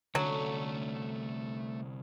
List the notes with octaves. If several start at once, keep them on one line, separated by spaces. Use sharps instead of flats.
C2 D3 F#3 A3 C#4 A5